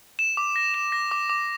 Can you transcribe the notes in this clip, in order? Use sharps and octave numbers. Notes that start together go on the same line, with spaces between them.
E7
D6
A#6
E7
A#6
D6
D6